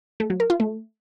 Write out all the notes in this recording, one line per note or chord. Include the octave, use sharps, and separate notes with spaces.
A3
F#3
A#4
F4
A3